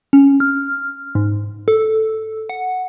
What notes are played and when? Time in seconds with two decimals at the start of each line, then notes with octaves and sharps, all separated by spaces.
0.13 C#4
0.40 F6
1.15 G#2
1.68 A4
2.49 F#5